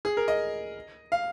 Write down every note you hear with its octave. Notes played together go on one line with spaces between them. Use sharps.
G#4
A#4
D#5
F5